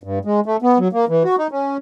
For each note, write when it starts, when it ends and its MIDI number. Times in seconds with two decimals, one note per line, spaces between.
0.03 0.19 43
0.25 0.40 56
0.46 0.57 57
0.62 0.78 59
0.78 0.88 54
0.93 1.05 58
1.09 1.23 52
1.24 1.36 66
1.38 1.47 63
1.51 1.77 61